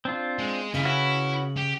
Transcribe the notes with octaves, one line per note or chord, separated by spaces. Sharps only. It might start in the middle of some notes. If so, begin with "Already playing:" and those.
C4 D4 F4
G#3
C#3 E4 D#5
C#4 E4 F#4 B4
G4